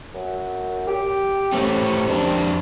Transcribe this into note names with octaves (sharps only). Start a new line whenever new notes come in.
F#2
G4
C3 A3 C#4
F2 D4